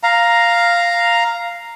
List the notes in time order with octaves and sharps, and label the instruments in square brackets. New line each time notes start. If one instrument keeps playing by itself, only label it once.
[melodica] F5 A#5